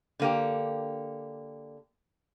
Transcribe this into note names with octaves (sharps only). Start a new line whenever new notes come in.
D3 A#3 G4